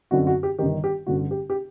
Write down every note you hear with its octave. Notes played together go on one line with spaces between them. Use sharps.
F#2 D3 F#3 C4 D#4 F#4
F#4
G4
G1 G2 D#3 G4
G4
A1 G2 D3 F#4
G4
G4